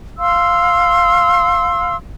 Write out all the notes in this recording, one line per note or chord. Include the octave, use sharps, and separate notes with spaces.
F5 C6 E6